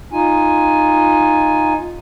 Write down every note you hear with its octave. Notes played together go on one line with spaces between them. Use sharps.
D#4 F4 G#5